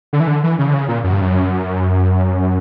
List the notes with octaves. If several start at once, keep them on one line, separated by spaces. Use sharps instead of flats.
D3
E3
D3
E3
C#3
D3
C#3
A#2
F#2
G2
F#2